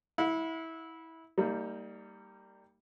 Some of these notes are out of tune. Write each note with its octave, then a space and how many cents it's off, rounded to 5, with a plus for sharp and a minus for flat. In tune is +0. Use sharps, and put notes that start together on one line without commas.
E4 -20 F#5 -40
G3 +0 A#3 -25 D#4 +30